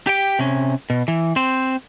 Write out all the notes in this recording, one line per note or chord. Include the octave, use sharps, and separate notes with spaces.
G4 G5
C3 C#4
B2
E3
C4 C5